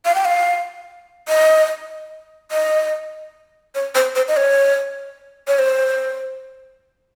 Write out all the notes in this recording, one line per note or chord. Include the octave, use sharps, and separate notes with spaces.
F5
G5
F5
D#5
D#5
C#5
C5
C5
D#5
C#5
C#5
C5